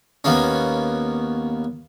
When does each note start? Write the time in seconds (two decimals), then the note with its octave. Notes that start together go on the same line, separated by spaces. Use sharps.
0.24 D#2 A#3 B3 C#4